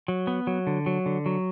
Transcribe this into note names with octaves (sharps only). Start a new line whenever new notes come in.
F#3
B3
F#3
D3
F#3
D3
F#3